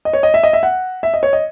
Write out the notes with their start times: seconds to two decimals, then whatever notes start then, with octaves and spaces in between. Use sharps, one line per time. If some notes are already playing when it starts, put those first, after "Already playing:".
0.05 D#5
0.13 C#5
0.23 D#5
0.34 E5
0.43 D#5
0.53 E5
0.63 F#5
1.03 E5
1.14 D#5
1.23 C#5
1.33 D#5